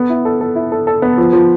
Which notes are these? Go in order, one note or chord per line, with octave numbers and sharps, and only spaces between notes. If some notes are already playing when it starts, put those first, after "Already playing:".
Already playing: B3 A4
E4
A4
A4
E4
A4
A4
B3
F3
F3